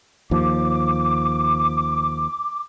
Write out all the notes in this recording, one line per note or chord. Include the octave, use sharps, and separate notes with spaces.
D#2 F3 D6